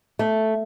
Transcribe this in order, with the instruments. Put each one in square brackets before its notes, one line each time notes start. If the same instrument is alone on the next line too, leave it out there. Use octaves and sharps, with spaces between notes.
[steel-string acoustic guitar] A3